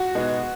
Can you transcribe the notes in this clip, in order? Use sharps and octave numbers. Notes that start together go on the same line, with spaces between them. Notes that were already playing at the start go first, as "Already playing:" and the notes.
Already playing: F#4
B2 G#3 B3 D#4 G#4